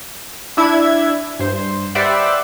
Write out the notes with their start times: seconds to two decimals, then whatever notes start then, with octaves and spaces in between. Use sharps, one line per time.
0.57 D4 E4 G#6
1.39 G2 C5
1.95 G4 B4 C5 D5 E5 F#5